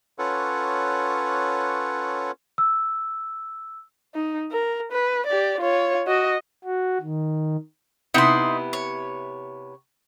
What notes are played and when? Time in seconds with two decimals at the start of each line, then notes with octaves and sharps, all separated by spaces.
0.19 C#4 F4 A4 B4 C#5 F#5
2.58 E6
4.14 D#4
4.52 A#4
4.92 B4
5.26 G4 D5
5.60 F4 C#5
6.07 F#4 D#5
6.65 F#4
7.01 D#3
8.14 C3 B3 D#4 E4 C6
8.73 C#5